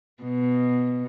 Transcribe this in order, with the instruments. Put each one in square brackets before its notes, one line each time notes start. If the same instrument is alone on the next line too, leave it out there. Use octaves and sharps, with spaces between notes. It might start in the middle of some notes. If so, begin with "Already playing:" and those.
[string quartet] B2